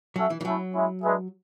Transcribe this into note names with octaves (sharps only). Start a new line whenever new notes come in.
F#3 C#4 F#4 A4 E5
E3
E3
F#3 A3 C#4 E4
G#3 C#4 E4
G#3 D4 G#4 B4 E5